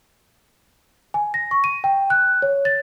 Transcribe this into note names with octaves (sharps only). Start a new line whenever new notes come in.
G#5
A#6
C#6
D#7
G5
F#6
C#5
A6